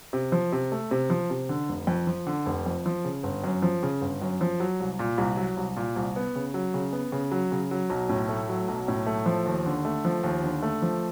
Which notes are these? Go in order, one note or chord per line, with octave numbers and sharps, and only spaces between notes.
C3
F3
C3
A3
C3
F3
C3
D3
F1
F2
F3
D3
F1
F2
F3
C#3
G1
F#2
F3
C#3
G1
F#2
F3
F#3
C2
A#2
C2
F#3
C2
A#2
C2
B3
C#3
F#3
C#3
B3
C#3
F#3
C#3
F#3
B1
A2
A3
F#3
B1
A2
A3
F3
D#2
D3
A3
F3
D#2
D3
A3
F3